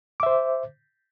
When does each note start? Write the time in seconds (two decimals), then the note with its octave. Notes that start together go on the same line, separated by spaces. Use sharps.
0.20 D6
0.23 E5
0.26 C5